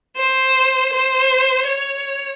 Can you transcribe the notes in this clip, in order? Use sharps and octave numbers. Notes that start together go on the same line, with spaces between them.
C5
C5
C#5